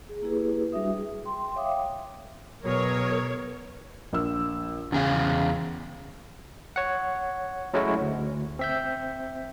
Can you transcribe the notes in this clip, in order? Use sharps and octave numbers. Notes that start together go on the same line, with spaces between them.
G#4
A#3 E4 G4 G#4 B4
G3 D4 F#4 E5 D#6
G#4
G5 C6
C#5 E5 F5 G5 D6 D#6
B2 F#3 G#4 A#4 C#5
A#1 E6
E2 C#3 G#4 F5
C#5 F#5
F#3 G#3 A3 C#4 E4 F#4
D2
C4 E5 G6